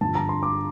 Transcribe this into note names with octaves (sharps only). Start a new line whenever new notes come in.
G2 D3 F3 A5
A#5
C6
D6